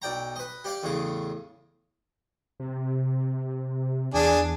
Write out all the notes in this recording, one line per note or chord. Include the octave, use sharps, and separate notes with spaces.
B1 D5 G5 A#5
B4 D#5
G4 D5 F5 G5
A1 E2 A2 C#3 G#4
C3
E2 D4 G#4